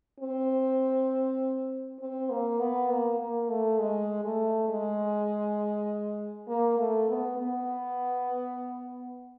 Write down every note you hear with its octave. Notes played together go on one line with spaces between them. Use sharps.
C4
C4
A#3
B3
A#3
A#3
A3
G#3
A3
G#3
A#3
A3
B3
B3